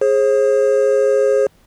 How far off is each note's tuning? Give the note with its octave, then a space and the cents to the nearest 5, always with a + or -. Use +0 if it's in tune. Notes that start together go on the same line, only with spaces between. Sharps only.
G#4 +5 C5 +45